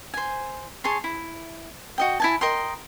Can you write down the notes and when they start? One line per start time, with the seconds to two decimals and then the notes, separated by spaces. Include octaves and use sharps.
0.14 C5 G#5
0.84 G#4 C#5 A5 C6
1.04 E4
1.98 F#4 D#5 G5
2.20 E4 G#5 A5
2.41 A#4 D#5 G5 C6